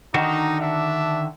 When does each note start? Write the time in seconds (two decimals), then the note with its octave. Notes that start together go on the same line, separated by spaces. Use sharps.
0.14 D3 D#3 D#4 F#4
0.61 D4 E5